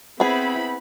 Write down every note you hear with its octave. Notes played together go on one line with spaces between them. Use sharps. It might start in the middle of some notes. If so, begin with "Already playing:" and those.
B3 C4 E4 G#4 B5